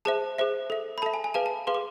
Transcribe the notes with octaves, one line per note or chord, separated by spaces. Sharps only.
G#4 C5 E5 A5
G#4 C5 E5
A4 E5
B5
A4 E5 A5
G#5
G#5
G#4 B4 F5 A5
A5
G#4 B4 F5 C6
D6